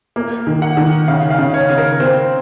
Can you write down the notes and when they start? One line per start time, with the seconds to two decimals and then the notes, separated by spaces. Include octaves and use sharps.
0.16 A#3
0.47 D#3
0.62 F#5
0.77 D#3
1.08 C#3 F5
1.30 F5
1.39 C#3
1.54 C#5
1.69 C#3
1.78 A#4
2.00 C4 C5